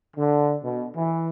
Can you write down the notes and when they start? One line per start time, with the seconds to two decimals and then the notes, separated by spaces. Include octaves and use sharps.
0.17 D3
0.63 B2
0.96 E3